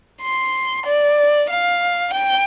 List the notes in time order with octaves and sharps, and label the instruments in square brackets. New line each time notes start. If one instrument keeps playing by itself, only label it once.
[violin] C6
D5
F5
G5